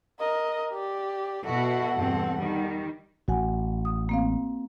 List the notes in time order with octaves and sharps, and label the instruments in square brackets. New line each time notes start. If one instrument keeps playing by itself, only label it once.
[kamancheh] A#4 D#5
G4 D5
[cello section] B2 E4 F#4 [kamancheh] A4 F#5
[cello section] E2 G2 C4
D#3 G3
[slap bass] A1 [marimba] F#4 F#5 G#5
[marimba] D#6
A#3 C4 F5